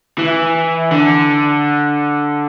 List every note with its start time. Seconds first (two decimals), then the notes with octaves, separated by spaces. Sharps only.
0.18 E3
0.92 D3